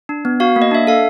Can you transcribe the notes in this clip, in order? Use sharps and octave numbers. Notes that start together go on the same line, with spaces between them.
D4
B3
F#4 F5
A#3
D#5
D4 E5
A4 F5